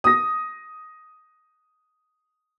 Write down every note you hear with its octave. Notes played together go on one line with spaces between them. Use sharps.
D#6 A#6